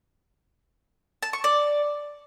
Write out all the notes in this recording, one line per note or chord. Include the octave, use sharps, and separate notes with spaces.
A5
C#6
D5